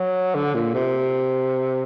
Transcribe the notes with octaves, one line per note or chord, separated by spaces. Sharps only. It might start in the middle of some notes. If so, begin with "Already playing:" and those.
Already playing: F#3
D3
A#2
C3